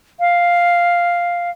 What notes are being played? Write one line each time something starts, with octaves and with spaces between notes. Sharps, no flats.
F5